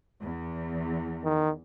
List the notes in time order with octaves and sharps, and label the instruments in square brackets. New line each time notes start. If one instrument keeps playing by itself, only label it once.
[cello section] E2
[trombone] D#3